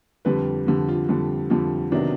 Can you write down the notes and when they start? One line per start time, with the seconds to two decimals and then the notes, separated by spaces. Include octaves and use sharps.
0.25 F2 D3 G3 B4
0.67 F2 D3 G3 G4
0.89 F4
1.09 F2 D3 G3
1.50 F2 D3 G3 F4
1.92 C3 D#3 F#3 B3 D4